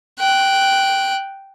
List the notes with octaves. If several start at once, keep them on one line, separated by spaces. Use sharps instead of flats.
G5 F#6